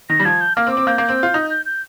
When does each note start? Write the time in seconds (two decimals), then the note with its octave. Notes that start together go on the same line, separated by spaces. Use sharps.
0.10 D#3 A#6
0.20 G3
0.25 F3 G#6
0.41 G6
0.56 A#3 F6
0.67 C4
0.72 D6
0.77 C4
0.87 A#3 G6
0.98 A#3
1.09 C4
1.23 F4
1.34 D#4
1.50 G6
1.66 G6